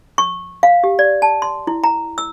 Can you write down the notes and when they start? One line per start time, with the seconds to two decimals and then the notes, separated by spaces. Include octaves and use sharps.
0.18 C#6
0.63 F5
0.84 G4
0.99 D5
1.22 A5
1.42 C6
1.67 E4
1.84 A#5
2.18 E6